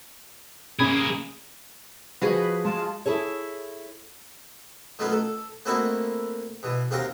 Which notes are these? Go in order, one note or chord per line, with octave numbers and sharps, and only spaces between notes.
A#3 C#4 G#4 B5 G#6
F3 F#4 G#4 B4 D#5
G#3 F4 A5
E4 G#4 A4 C#5
D#3 F#3 A3 B3 C#4 F4
A4
A3 A#3 C4 D#4 E4 F#4
B2 E3
D#2 C3 F#4 F5 G5 A#5